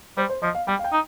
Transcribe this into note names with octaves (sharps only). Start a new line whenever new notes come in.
G3 C5
C5
F3 D#5
F5
G3 G5
F5
G5
D#4